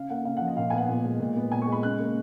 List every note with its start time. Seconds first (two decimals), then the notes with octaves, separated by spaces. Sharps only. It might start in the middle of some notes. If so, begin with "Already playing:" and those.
Already playing: C#3 F5
0.10 A#3 F#5
0.25 C#3 F5
0.37 F3 F#5
0.47 D#5
0.57 A#2 F5
0.70 G#5
0.73 B3 F#5
0.88 A#2
1.04 G#3
1.20 A#2
1.37 B3
1.52 A#2 G#5
1.62 C#6
1.67 G#3
1.72 B5
1.83 C#3 F#6
1.99 A#3